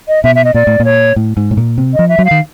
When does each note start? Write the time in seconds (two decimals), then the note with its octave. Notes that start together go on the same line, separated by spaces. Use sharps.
0.08 D#5
0.24 B2 E5
0.35 E5
0.45 D#5
0.54 A#2 D5
0.67 A2
0.80 A#2 C#5
1.16 A2
1.37 G#2
1.51 A2
1.57 A#2
1.78 C3
1.94 F3 D#5
2.09 E5
2.19 F#3
2.25 F5
2.31 D#3